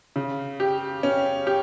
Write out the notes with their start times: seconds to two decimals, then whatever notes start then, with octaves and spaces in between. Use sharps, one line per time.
0.16 C#3
0.60 G4
1.03 C#4
1.47 G4